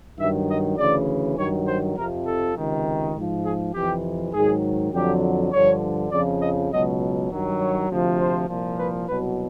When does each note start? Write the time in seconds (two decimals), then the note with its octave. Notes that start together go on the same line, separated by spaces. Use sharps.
0.19 G2 D#3 F#3 E5
0.49 D#5
0.78 D2 C#3 E3 D5
1.37 G2 D#3 F#3 C#5
1.67 C5
1.96 F2 C3 F3 A#4
2.26 A4
2.56 C#2 C3 D#3
3.15 G#2 F3
3.45 G#4
3.74 F2 C3 E3 G4
4.33 G#2 D#3 F#3 G#4
4.93 F2 D3 F#3 G4
5.52 G2 D3 F3 C#5
6.11 F2 C#3 F3 D5
6.41 D#5
6.71 C#2 B2 F#3 D#5
7.30 G2 D#3 F#3
7.60 C#5
7.90 D2 C3 F3
8.19 C5
8.48 C2 A#2 F3
8.78 B4
9.08 C2 B2 F#3 B4